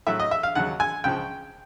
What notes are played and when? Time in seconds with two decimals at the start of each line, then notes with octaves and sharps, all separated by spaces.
0.07 A2 F#3 E5
0.19 D#5
0.31 E5
0.43 F5
0.55 D#2 C#3 F#3 F#5
0.80 G#5
1.04 C#2 C#3 F3 G5